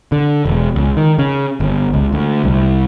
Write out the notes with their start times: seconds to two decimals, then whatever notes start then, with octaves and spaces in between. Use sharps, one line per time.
0.12 D3
0.45 E1
0.76 C#2
0.97 D#3
1.19 C#3
1.60 G1
1.93 C#2
2.12 D2
2.44 C2